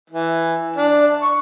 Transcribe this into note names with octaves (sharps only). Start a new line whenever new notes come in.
E3
D4
C#6